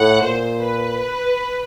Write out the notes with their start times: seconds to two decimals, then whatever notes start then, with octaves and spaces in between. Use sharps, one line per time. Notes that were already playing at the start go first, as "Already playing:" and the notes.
Already playing: A2 F#5
0.22 A#2 C5
0.61 B4